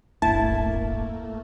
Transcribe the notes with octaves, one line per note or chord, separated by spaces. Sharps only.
D1 G1 A3 A#3 E4 A5